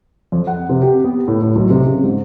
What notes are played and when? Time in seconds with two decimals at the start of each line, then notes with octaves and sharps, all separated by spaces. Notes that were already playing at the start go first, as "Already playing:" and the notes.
0.32 F2
0.47 F#5
0.69 C3
0.82 G4
1.04 B3
1.28 A2
1.42 A2
1.56 B1
1.70 C3
1.86 C#3
2.03 G#2